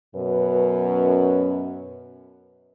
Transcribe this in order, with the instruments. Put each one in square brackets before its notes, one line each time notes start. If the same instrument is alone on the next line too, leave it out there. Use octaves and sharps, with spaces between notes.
[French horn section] F#2 B2 B4